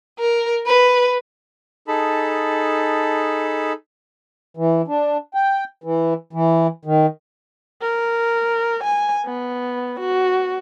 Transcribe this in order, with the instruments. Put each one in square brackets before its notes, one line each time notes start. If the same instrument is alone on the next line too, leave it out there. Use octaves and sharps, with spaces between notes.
[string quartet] A#4
B4
[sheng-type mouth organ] D#4 G#4 A4 A5 B5
[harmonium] E3
D4
G5
E3
E3
D#3
[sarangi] A#4
G#5
B3
F#4